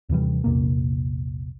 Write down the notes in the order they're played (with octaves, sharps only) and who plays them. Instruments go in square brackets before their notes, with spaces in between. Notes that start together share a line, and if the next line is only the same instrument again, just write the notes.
[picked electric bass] D#2 C3 E3 G3
A#1 E2 C3 A#3